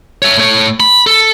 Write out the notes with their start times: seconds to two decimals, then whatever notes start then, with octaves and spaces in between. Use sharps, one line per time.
0.22 C#5 E5
0.37 A3 C#5
0.80 B5
1.07 A4